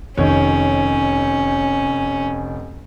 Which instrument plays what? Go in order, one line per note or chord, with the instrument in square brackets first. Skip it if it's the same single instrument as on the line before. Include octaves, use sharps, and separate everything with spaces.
[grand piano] F1 D#3 C#5 [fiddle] C#4